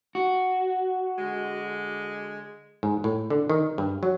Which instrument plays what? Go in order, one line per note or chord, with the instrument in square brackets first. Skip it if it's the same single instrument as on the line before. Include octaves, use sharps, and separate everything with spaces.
[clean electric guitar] F#4
[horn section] D3 G#3
[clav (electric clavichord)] G#2
A2
D3
D#3
G2
F#3